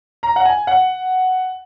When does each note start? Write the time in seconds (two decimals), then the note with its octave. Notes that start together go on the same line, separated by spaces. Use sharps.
0.23 A#5
0.36 F#5
0.45 G#5
0.67 F#5